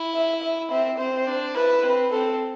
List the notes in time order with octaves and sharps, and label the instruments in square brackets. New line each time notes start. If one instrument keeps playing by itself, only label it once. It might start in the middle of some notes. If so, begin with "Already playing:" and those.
Already playing: [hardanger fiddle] E4
[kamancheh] E5
E5
[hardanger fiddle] C4 [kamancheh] E5
[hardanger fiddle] C4 [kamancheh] C5
[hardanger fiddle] D4
[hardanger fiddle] E4 [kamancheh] B4
[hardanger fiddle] C4
[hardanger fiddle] C4 [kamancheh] A4